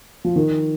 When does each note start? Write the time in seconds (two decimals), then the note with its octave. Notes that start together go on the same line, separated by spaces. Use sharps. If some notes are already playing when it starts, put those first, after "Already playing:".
0.25 F3
0.36 D#3